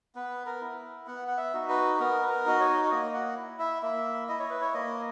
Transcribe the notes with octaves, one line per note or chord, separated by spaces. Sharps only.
B3 B4
A#4
E4
B3 F#5
F#5
E5
D#4 F#4
B4
B3 A#4
B4
A#4
D#4 F#4 D#5
C#5
A#3 D#5
F#5
E4
E5
A#3 E5
E4 D#5
C#5
B4
C#5
A#3 D#5